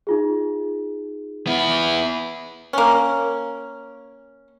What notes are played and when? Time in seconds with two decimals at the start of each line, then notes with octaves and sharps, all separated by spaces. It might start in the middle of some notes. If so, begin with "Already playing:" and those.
0.07 D#4 F4 G#4
1.47 B3 E4
2.73 A#3 C#4